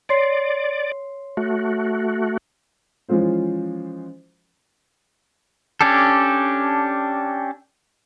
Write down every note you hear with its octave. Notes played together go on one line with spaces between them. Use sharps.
C#5 D5 C6 C7
A3 F#4
E3 F3 G#3 C#4 F4 C5
C#4 D4 G4 A4